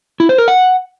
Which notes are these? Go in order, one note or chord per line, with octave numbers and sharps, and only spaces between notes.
E4
C5
A#4
F#5